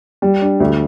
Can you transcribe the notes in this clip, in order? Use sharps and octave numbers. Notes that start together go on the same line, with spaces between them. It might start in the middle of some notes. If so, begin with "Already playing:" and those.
G3
D4
D2